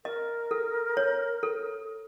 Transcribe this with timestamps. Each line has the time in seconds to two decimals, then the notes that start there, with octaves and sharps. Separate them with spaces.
0.05 A#4 D#5
0.51 A4
0.97 C#5
1.43 A4